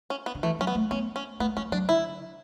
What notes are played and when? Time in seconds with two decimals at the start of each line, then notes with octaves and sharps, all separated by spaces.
0.10 C#4
0.26 B3
0.35 D3
0.43 E3 A3
0.59 F#3 C#4
0.67 B3
0.75 A3
0.91 B3 C#4
1.16 C#4
1.40 A3 B3
1.57 G#3 C#4
1.72 F#3 D4
1.89 D3 E4